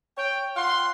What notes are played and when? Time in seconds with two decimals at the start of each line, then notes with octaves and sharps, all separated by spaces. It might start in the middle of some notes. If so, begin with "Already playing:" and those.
0.18 C#5 G5
0.57 F4 F5 F#5 C6